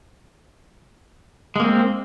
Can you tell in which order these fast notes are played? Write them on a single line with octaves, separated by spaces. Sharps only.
G#3 A#3 C4